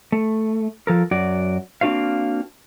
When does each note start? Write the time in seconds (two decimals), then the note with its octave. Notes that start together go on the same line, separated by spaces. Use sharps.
0.12 A3
0.87 F3 A4 A#4
1.11 F#2 F#4 D5
1.81 A#3 C4 D4 F#4 C5 F5